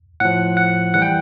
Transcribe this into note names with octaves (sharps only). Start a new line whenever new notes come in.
A2 F3 F#5
F#5
E3 G3 F#5
G5